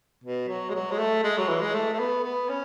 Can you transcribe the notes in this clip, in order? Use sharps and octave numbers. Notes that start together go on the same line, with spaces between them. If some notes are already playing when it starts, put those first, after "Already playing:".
B2
F#3
G#3
F#3
G#3
A3
G#3
F#3
E3
G#3
A3
A3
B3
B3
C#4